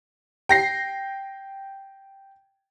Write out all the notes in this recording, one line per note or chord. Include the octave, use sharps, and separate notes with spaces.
G5 A#6 C7